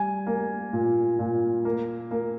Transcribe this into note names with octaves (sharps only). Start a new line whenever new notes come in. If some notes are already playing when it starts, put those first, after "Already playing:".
Already playing: G3 G#5
A#3
A#2
A#2
A#3
A#3